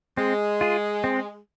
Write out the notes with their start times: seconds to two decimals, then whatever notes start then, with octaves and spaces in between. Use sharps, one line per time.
0.17 G#3 C4
0.61 F4 G#4
1.04 C4